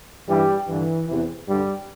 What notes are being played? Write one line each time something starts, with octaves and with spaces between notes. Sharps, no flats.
G2 E3 G3
G2 D3 E3
E2 C3 E3
G2 D3 G3